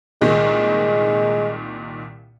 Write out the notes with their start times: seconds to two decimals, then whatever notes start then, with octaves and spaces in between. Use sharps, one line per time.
0.21 C2 A#2 D#3 G#3